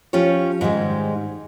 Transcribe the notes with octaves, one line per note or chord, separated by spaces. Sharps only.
F3 C#4 F4 G4 C#5
G#2 D#3 G3 G#3